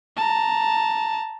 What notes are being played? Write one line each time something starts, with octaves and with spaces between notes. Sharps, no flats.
A5 A#5